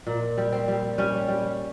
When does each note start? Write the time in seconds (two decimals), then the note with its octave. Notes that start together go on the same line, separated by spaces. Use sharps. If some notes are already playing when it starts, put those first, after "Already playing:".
0.07 A#2
0.37 G3
0.52 C4
0.68 G3
0.98 G3 C#4
1.28 G3